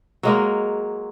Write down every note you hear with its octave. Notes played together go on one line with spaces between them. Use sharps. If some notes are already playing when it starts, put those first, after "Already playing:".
F#3 G#3 A#3